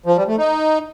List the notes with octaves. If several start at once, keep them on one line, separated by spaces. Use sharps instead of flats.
F3
G3
A3
D#4